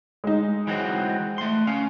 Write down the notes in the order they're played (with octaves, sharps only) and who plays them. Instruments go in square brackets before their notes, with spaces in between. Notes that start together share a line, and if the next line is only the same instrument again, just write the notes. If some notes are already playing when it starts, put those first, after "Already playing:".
[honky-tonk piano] G#3 D#4
[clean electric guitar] E3 F#3 C4
A3 C6
C#4 F5